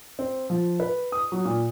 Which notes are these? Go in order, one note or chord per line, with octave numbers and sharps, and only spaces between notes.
C4
F3
B4
D#6
F#3
A#2